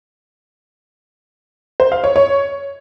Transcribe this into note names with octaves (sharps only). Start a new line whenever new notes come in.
C5
F5
C#5
C#5